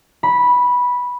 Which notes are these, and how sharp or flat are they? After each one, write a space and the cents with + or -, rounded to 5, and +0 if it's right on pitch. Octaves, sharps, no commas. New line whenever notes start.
B5 -10